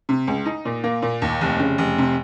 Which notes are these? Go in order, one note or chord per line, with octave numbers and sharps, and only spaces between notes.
C3
C#2
D#4
A#2
A#3
A#2
D#2
F1
C#3
F1
C3